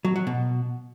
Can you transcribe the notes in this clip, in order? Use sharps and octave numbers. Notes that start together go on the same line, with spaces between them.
F#3
F#3
B2